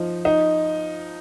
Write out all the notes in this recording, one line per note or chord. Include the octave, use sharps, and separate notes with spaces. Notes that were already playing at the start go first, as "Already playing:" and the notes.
Already playing: F3 D#4
D#4